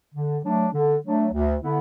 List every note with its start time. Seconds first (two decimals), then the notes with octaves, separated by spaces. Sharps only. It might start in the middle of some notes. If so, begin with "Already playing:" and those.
0.14 D3
0.44 F#3 A3 D4
0.73 D3
1.04 F#3 A3 D4
1.32 D2
1.63 D3 B3 E4